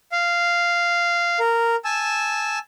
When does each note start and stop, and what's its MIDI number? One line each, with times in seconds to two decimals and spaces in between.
0.12 1.39 77
1.40 1.76 70
1.85 2.59 80
1.85 2.59 81
1.85 2.59 88